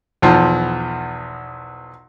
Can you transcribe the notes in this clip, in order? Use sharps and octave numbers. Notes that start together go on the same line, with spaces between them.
B1 E2 F3